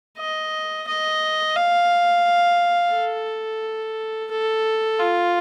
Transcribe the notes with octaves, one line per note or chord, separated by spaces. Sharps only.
D#5
D#5
F5
A4
A4
F4